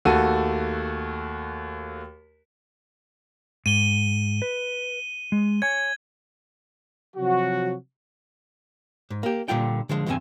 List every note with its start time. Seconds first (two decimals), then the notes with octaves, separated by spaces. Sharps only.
0.05 D#2 A3 F#4 A4 D#7
3.66 G#2 D#7 G7
4.42 B4
5.32 G#3
5.62 C#5 G#5 G#6
7.17 C3 F3 F#3 F#4
9.10 G#2
9.23 A#3 G4
9.48 A#2 D3 G3 F4 G5
9.89 D3 F3 G#3
10.06 E2 G2 C#3 F#3 C4 G#5